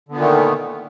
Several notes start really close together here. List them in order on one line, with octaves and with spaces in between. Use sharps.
D3 B3 A#2 D#3 A3